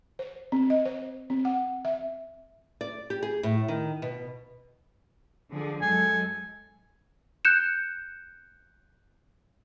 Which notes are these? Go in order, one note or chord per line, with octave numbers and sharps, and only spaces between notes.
C5
C4
D#5
C5
C4
F#5
E5
D5
G4
G#4
A2
D#3
B2
D3 F3 G#4
F#2 G#3 A4 G#5
F#6 G6 C#7 E7